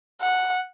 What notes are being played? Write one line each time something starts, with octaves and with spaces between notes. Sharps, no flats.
F#5